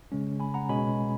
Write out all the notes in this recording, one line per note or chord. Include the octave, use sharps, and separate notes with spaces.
C#3 G#3 C#4
G#5 B5
F#5 A#5
B2 G#3 C#4 G#5 B5